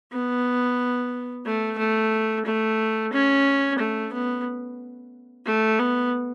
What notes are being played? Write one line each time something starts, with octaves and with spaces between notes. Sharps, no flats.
B3
A3
A3
A3
C#4
A3
B3
A3
B3